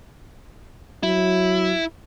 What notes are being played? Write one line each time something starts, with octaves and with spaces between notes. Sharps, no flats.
F#3 E4